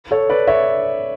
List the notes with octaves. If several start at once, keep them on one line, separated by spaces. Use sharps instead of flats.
A4 C#5
B4 D5
C#5 E5